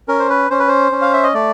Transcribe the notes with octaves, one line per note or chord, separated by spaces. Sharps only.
C#4 A#4
C5
B4
C#4 C5
B4
C5
C#4
F5
E5
D#5
A3 D5